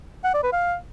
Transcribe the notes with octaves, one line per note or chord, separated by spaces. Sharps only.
F#5
D5
B4
F5